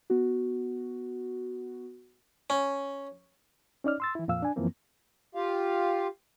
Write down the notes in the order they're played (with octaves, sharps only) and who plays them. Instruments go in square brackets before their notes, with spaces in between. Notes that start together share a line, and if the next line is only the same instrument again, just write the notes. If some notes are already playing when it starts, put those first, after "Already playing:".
[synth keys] B3 F#4
[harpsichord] C#4
[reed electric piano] C#4 D#4 D5 F6
C6 E6 A6
E3 E4
F2 A#2 F3 F5 E6
D4 G#5
F#2 E3 F3 A#3 C4
[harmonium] F4 G4 F5